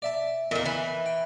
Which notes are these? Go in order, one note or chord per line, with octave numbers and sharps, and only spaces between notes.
D5 E5 A5
E2 A#2 A#3 D#5
E3 G#5
G5